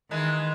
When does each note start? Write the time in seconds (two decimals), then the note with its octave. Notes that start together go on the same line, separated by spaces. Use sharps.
0.11 D#3 E3 G#3